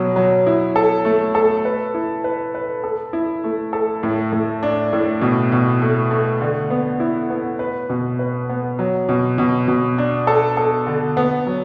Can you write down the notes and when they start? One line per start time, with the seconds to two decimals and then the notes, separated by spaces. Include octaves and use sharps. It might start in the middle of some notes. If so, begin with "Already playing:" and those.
Already playing: B2 F#3
0.16 F#3
0.47 E4
0.76 A4
1.05 A3
1.35 A4
1.65 B4
1.94 E4
2.24 B4
2.55 B4
2.84 A4
3.13 E4
3.44 A3
3.73 A4
4.03 A2
4.32 A2
4.63 D4
4.93 A2
5.21 B2
5.52 B2
5.82 A3
6.11 A3
6.41 D3
6.70 B3
7.00 E4
7.30 B3
7.59 B4
7.89 B2
8.19 B4
8.49 B3
8.79 F#3
9.09 B2
9.38 B2
9.68 B2
9.98 D4
10.27 A4
10.57 A4
10.87 D3
11.17 B3
11.47 F#3